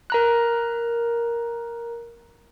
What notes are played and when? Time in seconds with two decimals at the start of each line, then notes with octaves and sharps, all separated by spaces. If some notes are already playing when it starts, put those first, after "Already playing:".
0.10 A#4 A#5 F#6